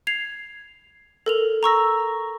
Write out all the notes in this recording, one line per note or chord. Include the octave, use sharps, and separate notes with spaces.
G#6 C7 F7
A4 A#4 F7
A#5 C#6 E6 A#6